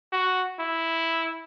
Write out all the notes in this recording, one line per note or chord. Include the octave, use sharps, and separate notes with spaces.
F#4
E4